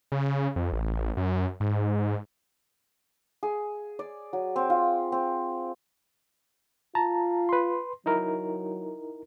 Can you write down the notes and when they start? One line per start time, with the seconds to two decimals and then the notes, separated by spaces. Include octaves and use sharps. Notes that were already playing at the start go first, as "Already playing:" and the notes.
0.12 C#3
0.56 F2
0.73 A1
1.17 F#2
1.60 G#2
3.43 G#4
3.99 D5
4.33 F#3
4.56 C4
4.70 F4
5.12 C4
6.95 F4 A5 A#5
7.49 B4 C6
8.06 F#3 D#4 E4 A#4